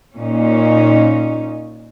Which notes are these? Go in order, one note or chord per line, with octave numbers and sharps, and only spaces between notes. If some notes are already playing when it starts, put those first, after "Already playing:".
A#2 C#4 D#4